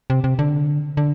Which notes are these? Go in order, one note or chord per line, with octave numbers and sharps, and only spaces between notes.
C3
C3
D3
D3